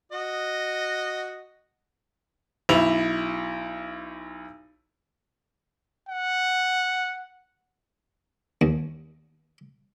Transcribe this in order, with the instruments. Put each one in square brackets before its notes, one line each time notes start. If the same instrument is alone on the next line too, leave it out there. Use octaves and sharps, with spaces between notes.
[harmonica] F#4 D#5
[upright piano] B1 E4 F7
[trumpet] F#5
[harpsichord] D#2